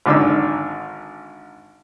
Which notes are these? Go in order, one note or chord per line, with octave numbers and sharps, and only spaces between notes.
G#1 D3 D#4 D6 E6